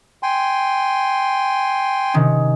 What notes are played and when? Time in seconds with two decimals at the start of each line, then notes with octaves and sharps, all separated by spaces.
0.23 G5 G#5 C6
2.14 C3 D#3 C#4